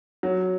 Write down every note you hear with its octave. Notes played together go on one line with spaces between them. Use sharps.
F#3